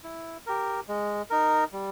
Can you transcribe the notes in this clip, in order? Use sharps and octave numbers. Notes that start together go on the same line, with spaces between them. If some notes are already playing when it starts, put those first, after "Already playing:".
E4
G4 A#4
G#3
D#4 A#4
G3